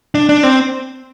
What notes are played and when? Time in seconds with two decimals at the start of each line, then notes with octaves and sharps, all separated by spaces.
0.15 D4
0.29 D4
0.43 C4